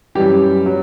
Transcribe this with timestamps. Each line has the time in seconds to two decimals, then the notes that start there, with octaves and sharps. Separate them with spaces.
0.15 F#2 E3 G3 G4
0.66 F#3